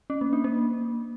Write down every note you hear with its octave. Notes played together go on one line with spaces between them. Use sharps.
C#4
A#3
D4
A#3